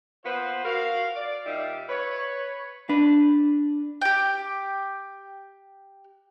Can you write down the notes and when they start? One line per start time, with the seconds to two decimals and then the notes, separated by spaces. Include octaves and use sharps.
0.25 F3 A#3 B3 B4 C5
0.65 F#4 A#4 F5
1.16 D5
1.45 A#2 G3 D#4 G4 E5 F5
1.89 B4 C#5
2.89 D4 B4
4.02 G4 G5